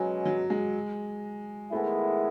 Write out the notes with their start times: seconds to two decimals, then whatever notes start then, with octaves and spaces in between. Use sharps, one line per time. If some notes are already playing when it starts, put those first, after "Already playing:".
Already playing: B2 F#3 G#3 C#4
0.25 F#3
0.50 G#3
1.72 D#3 G#3 A3 B3 E4